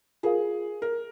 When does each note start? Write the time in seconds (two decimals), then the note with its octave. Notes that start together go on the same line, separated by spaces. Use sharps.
0.23 F4 G#4 A#4 F5
0.82 A#4